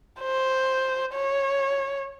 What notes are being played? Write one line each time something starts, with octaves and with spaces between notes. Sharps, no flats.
C5
C#5